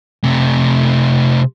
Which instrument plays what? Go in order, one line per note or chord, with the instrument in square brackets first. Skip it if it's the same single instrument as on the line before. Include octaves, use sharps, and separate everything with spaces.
[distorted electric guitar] C3 A3